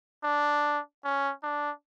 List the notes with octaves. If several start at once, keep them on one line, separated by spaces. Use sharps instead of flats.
D4
C#4
D4